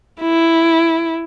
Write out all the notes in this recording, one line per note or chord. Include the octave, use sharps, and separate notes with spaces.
E4